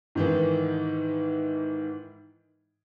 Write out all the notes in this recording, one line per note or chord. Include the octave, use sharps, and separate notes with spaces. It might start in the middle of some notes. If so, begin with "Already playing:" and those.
G#2 D#3 E3